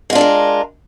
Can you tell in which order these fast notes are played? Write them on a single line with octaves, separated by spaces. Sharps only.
G#3 F4 D4 A4 A#4